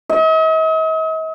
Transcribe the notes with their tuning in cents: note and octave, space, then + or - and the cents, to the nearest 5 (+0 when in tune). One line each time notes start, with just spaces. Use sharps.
D#5 +45